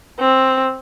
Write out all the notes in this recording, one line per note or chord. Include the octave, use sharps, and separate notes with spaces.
C4